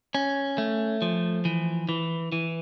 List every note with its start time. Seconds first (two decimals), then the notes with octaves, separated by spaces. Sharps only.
0.15 C#4
0.58 A3
1.02 F3
1.45 E3
1.89 E3
2.32 E3